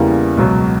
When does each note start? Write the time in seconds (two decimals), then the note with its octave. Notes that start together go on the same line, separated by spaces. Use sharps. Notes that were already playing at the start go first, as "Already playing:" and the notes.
Already playing: E2 C#3 E3 G3 A#3
0.37 C#2 B2 F#3